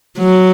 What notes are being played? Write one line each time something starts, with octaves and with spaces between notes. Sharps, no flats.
F#3